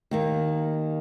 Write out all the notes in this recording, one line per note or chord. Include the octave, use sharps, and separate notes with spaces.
D#2 D#3 A#3